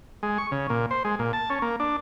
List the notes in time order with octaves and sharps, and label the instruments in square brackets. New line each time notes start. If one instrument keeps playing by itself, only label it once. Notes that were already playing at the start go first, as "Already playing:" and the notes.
[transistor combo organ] G#3
C#6
C#3
A#2
C5
G#3
A#2
A5
C#4
A#3
D4